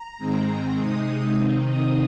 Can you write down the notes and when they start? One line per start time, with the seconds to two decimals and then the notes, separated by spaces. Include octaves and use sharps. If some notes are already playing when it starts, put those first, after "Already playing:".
Already playing: A#5
0.18 G#2 D#3 G#3 C4
0.76 C3 G#3 D#4 D#6
1.35 C3 D#3 C4 D#4
1.64 D#6